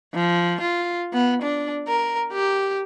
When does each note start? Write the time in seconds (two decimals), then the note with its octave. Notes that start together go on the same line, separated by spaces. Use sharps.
0.14 F3
0.61 F4
1.13 B3
1.42 D4
1.88 A#4
2.33 G4